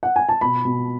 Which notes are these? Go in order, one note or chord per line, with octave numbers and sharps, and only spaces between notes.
F#5
G#5
A5
B2 B5
B2